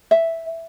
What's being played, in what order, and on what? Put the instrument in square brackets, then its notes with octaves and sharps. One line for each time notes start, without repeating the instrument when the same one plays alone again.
[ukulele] E5